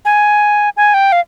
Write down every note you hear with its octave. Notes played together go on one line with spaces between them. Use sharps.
G#5
G#5
G5
F5